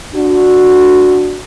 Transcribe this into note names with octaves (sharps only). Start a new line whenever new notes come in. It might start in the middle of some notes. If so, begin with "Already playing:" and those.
D4 F#4